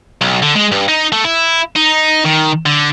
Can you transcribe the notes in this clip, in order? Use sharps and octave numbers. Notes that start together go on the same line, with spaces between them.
B1
D3
G#3
G2
D#4
A3
E4
D#4
D#3
D3